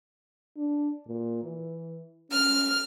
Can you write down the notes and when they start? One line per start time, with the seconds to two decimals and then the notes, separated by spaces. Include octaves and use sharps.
0.57 D4
1.07 A#2
1.44 E3
2.31 C#4 F6